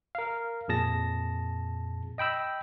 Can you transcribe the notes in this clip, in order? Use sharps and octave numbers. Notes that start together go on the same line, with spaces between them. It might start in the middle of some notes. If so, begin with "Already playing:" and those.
A#4 F5
F2 A#2 G#4 A5 A#6
D#5 G5 B5 E6 G6